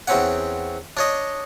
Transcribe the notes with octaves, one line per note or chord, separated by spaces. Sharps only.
E2 C4 C#4 F#5
D4 C#5 D#5